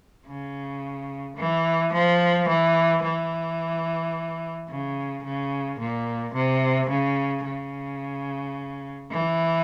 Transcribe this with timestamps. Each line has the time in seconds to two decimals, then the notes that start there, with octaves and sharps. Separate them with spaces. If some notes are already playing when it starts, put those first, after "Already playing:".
0.26 C#3
1.37 E3
1.92 F3
2.48 E3
3.03 E3
4.69 C#3
5.24 C#3
5.79 A#2
6.34 C3
6.89 C#3
7.45 C#3
9.11 E3